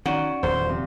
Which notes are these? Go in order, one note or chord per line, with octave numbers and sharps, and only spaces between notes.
D#3 C#4 F#4 D5
D#1 E2 C5
C3 F3